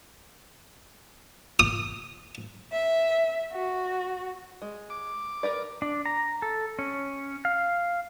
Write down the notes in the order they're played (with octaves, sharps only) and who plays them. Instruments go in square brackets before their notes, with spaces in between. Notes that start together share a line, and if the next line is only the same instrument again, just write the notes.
[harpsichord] D#6
[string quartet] E5
F#4
[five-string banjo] G#3
[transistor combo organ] D6
[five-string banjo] A#4 B4 D5
[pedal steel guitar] D4
A#5
A4
C#4
F5